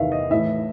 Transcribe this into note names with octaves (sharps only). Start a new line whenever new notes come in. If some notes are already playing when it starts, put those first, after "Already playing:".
Already playing: E2 C3 D#3 E5 F5
D#5
A2 E3 E5